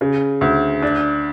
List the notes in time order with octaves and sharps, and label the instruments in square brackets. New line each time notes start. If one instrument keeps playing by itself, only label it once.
[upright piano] C#3
D2
D4